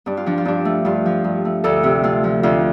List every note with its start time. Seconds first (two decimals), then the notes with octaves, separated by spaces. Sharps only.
0.06 G2 D4
0.17 F4
0.26 F3 D4
0.38 F4
0.45 G2 D4
0.65 A3
0.85 G2 F4
1.06 F3
1.24 G2
1.45 A3
1.64 D2 A4
1.83 C3
2.04 A3 F4
2.24 F3
2.43 D2 F4